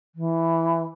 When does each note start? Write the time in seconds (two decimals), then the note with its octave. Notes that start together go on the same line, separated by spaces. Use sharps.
0.15 E3